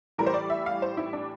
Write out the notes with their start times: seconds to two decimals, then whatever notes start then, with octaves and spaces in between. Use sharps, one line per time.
0.18 A2 E3 G3 A#4
0.26 C5
0.34 D5
0.50 E5
0.66 F5
0.82 C5
0.97 E4
1.13 D4